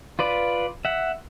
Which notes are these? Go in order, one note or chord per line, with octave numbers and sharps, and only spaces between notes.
F4 B4 D5
E5 F#5